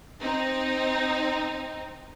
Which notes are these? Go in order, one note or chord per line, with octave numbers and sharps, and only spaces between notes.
C4 D#4